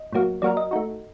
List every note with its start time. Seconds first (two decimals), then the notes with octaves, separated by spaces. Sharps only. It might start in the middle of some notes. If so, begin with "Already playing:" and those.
Already playing: D#5
0.12 A2 F#3 A#3 F#4
0.42 F#3 A#3 F#4 A#4 D5
0.57 D#5
0.71 A3 D#4 F#4